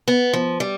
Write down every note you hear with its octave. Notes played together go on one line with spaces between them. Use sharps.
B3
F3
G3